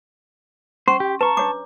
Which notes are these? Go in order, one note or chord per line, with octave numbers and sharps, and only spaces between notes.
C#4 C5 C6 C#6
G4
B4 A5 A#5 C#6
D4 C#5 D6